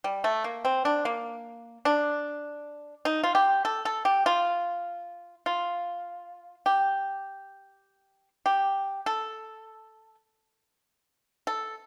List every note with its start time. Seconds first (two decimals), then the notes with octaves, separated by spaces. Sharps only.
0.04 G3
0.24 A3
0.44 A#3
0.65 C4
0.85 D4
1.05 A#3
1.85 D4
3.05 D#4
3.24 F4
3.35 G4
3.65 A4
3.85 A4
4.05 G4
4.26 F4
5.46 F4
6.66 G4
8.46 G4
9.06 A4
11.47 A4